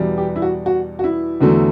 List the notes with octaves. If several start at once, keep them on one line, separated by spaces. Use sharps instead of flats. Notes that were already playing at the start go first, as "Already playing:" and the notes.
Already playing: E2 B2 G3
G4
E4
F#4
F#4
F#4
E4
E2 D3 F#3 A3